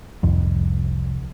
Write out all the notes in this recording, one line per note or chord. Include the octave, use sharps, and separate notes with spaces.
F1 C2 F2